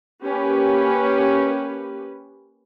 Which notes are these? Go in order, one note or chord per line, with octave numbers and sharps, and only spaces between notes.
A#3 C#4 G4 B4